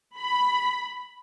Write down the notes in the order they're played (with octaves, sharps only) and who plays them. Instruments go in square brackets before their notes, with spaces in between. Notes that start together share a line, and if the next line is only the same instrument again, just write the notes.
[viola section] B5